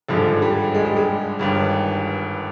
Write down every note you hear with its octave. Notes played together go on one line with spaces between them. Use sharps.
G#1 G2 D3 F3 G#3
G3
G#3
G3
G#3
G1 G2 D#3